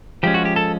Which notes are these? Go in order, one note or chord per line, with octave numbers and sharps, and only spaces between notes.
F3 G#3 C#4 G4
F#4
G4
A4